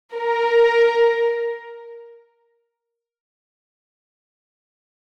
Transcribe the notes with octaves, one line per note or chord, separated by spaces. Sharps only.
A#4